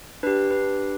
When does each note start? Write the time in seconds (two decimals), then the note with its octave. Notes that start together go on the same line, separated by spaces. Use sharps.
0.23 D4 G4 B4
0.51 B4